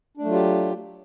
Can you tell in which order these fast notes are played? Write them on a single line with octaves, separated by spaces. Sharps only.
D4 A3 F#3 F4 G4